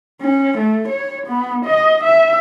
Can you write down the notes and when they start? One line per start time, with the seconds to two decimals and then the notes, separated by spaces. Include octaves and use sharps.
0.21 C#4
0.58 A3
0.88 C#5
1.27 B3
1.65 D#5
2.04 E5